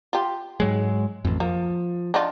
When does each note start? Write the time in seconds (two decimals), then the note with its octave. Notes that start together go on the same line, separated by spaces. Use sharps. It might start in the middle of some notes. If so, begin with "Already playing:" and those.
0.13 F4 G4
0.60 G#2 F#3 G#3
1.25 A1 F2
1.40 F3 A#3
2.14 D4 D#4 F4